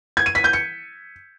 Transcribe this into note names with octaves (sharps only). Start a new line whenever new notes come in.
G#6
D#7
B6
G6
C#7